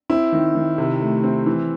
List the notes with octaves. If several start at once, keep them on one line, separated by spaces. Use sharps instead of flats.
C4 E4
D#3
D#3
C3
A3
C4
E3